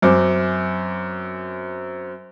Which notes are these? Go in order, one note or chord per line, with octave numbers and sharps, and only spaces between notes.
F#2 C4 D6